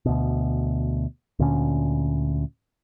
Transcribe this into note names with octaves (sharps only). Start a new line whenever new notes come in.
D2 B2
D2 A#2 D3 C#4